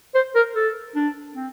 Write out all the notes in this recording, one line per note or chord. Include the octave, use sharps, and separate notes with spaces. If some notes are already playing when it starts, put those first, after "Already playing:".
C5
A#4
A4
D4
C4